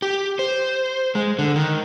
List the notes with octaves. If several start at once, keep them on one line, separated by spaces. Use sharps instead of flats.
G4
C5
G#3
D3
D#3